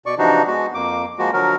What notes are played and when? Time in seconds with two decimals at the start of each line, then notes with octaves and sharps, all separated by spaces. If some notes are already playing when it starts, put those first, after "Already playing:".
0.06 B2 D5 C#6
0.18 C3 E3 F3 D4 D#4 F#4
0.47 G#3 B3 F#4
0.74 F2 A#3 D6
1.18 F3 G#3 A#3 F#4
1.33 D3 F3 F#3 F#4 A#4